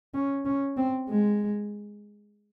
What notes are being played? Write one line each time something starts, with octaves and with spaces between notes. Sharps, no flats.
C#4
C#4
C4
G#3